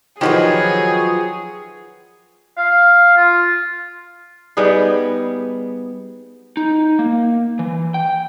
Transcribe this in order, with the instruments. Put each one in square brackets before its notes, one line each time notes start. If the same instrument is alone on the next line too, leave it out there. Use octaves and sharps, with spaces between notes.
[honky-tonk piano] D#3 D#4 G4 [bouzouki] F3 F#3 B4 [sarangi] G#4 [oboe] C#5
[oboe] F5
F4
[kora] G3 B3 D#4 G#4
[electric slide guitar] D#4
A#3
E3
G5